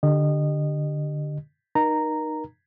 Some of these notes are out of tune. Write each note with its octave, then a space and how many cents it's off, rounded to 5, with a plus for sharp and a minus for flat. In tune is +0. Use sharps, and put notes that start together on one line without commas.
D3 +10 G4 +0 D#5 -25
D#4 -20 A#4 +30 A#5 -10